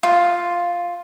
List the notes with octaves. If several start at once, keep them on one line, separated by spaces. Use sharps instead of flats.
F4